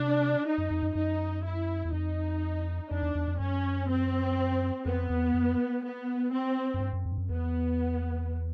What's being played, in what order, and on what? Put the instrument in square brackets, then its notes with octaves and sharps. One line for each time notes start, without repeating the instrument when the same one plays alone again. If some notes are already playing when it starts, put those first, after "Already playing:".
Already playing: [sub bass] C3 [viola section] D4
[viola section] D#4
[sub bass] F#2
F2
F#2
[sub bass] F#2 [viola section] D#4
[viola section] E4
[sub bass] E2
[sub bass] F2 [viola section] D#4
[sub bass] F2 [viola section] D4
[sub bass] E2
E2
F2
[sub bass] F#2 [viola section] C#4
[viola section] C4
[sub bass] F2 [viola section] B3
[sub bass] E2
F2
[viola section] B3
C4
[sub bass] F#2
G2
F#2
F2
G2
F#2
[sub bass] E2 [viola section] B3